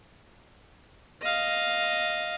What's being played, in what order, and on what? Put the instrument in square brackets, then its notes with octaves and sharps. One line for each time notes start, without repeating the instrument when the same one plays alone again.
[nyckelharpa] D#5 F5